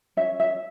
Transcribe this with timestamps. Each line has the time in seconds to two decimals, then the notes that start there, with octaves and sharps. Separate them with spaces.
0.17 C#4 E5
0.40 E5